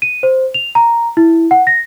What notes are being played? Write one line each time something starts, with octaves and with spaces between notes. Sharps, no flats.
D#7
C5
F7
A#5
E4
F#5
A#6